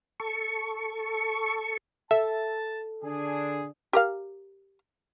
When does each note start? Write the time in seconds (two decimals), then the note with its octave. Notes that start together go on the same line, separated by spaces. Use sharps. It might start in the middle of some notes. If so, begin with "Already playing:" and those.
0.20 A4 C#6
2.11 A4 E5 A5
3.03 D3 D4 G#4
3.93 G4 A#4 F5